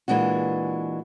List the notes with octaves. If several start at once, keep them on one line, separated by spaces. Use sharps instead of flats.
A#2 E3 G#3 D4 F#4